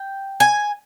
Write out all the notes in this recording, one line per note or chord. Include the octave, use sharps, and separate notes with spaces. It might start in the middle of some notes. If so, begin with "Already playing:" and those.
Already playing: G5
G#5